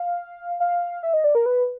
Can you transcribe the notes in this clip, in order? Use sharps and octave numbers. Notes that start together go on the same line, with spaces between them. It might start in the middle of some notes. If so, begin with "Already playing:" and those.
Already playing: F5
F5
E5
D#5
D5
A#4
B4